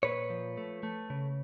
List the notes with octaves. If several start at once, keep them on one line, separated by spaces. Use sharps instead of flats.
A#2 B4 C#5
F3
A3
A3
C#3